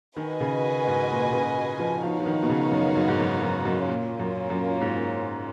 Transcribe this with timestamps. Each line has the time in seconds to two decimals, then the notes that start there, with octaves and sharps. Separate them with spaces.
0.17 D#3 F#4 B4 D#5 G#5
0.40 C#3
0.87 G#2
1.10 A#2
1.33 C#3
1.79 F3
2.03 F3 B3 D#4 F#4 C#5 F5
2.20 F3
2.26 D#3
2.43 B2
2.50 C#3
2.72 F#2
2.96 F#2
3.08 G#2
3.19 F#2
3.42 F#2
3.65 F#2
3.88 A#2 A#3 C#4 F4
4.19 F#2
4.50 F#2
4.81 G#2